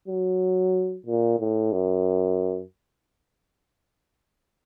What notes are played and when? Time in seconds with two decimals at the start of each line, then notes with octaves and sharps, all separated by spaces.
0.08 F#3
1.06 A#2
1.39 A2
1.72 F#2